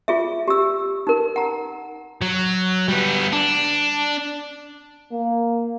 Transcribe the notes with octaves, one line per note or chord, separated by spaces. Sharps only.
F4 G#4 E5
G4 E6
D#4 A#4
F#5 A#5
F#3
G3 B3
D4
A#3